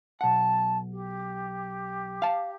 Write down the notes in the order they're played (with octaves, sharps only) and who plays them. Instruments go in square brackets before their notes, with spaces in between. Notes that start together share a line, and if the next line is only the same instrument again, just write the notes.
[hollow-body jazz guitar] B1 F#5 [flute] A5
[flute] G4
[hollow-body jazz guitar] F5 A5